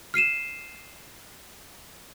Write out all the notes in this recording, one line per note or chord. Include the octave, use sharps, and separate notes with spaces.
F6 C7 D#7 E7